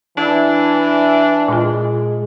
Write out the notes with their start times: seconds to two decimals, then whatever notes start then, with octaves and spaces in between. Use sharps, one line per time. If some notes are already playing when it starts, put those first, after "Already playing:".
0.17 E3 D4 E4 D5
1.48 A#2 G#3 F4